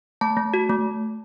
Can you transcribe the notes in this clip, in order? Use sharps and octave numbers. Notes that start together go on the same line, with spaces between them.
A3 A5
A3
F#4
A3